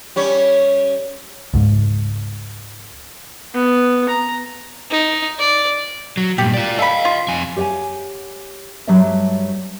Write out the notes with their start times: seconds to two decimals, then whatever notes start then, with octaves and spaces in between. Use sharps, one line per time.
0.16 G3 C#4 C#5
1.54 C#2 G#2
3.55 B3
4.09 A#5
4.90 D#4
5.39 D5
6.17 F#3
6.38 G2 A#2 G4
6.54 F4 D5
6.79 A4 D#5 F5 B5
7.05 F4
7.28 F2 G#5
7.56 G4 C#5 D#5 F#5 G#5
8.87 G2 F#3 G3 A3 C#5 E5